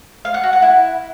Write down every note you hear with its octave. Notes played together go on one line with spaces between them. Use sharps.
F5
F#5
F#4
F#5
E4